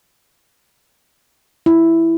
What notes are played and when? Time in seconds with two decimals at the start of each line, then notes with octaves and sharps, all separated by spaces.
1.66 E4